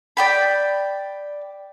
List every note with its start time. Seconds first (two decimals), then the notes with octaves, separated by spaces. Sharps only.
0.17 D5 G5 B5